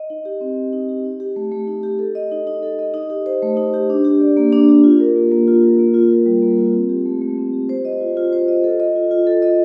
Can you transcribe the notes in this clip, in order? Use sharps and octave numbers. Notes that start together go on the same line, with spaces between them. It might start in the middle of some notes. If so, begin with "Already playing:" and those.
Already playing: D#5
D#4
G4
C4
C4
D#4
G4
D#4
G4
A3
A3
D#4
G4
A4
D#5
D#4
D#4
A4
D#5
D#4
G4
C5
A3
D#4
G4
D4
G4
D5
A#3
D4
G4
F4
A#4
A#3
A#3
F4
A#4
A#3
F4
A#4
G3
A#3
F4
C4
G4
A3
A3
C4
G4
C5
D#5
F4
F4
C5
D#5
A4
D#5
F4
F4
A4
D#5